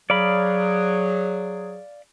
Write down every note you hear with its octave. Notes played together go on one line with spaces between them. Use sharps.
F#3 G#4 D5 F5 B5